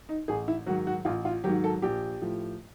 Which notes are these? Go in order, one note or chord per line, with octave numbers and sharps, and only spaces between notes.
D#4
A1 G#4
E4
G#2 D#3 F#3 F#4
F#4
A1 F4
F4
G#2 D#3 F#3 G4
A4
A#1 G4
A2 F3